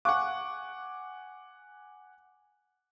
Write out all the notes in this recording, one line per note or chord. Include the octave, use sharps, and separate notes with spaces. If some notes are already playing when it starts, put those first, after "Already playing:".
F5 F#5 G#5 C#6 D6 F#6